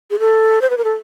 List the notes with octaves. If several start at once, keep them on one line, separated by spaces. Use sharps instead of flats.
G#4
A4
C5
B4
A#4
A4